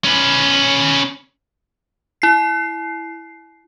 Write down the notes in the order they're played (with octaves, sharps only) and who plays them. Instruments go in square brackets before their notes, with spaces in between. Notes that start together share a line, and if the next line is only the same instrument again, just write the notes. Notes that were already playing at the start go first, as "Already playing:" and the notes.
[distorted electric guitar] C#4 B4
[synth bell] E4 C7